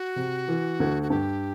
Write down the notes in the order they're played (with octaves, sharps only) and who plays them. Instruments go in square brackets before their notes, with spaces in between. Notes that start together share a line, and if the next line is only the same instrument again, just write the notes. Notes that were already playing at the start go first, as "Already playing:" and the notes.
Already playing: [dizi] F#4
[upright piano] C3
E3
D2
[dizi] F#4
[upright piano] G2 [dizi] G4